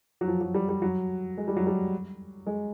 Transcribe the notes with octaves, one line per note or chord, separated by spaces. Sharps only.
F#3
F3
F#3
G3
G3
F#3
G#3
G3
F#3
G3
G#3